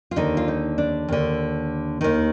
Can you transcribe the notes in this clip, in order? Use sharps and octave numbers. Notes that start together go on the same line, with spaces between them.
F4
D#2 D3 D#4
F4
D#4
D4
D#2 D3
D#2 D#3